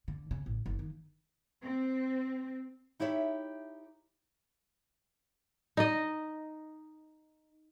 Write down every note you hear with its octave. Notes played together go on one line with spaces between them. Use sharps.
D3
C#3
A1
F#1
D#3
C4
D#4 E4 G4 C#5 E5
D#4 D#5